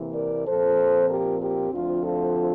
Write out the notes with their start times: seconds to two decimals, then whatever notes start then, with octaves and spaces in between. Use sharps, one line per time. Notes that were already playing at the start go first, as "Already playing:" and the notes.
Already playing: C3 E3 A#3
0.14 A#4 D5
0.46 A#2 F3 C4 A4 C5
1.10 G4 A#4
1.41 G4 A#4
1.72 D2 D3 F3 C4 F4
2.04 F4 A4